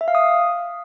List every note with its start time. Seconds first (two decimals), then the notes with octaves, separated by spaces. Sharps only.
0.01 E5
0.08 F5
0.15 D#6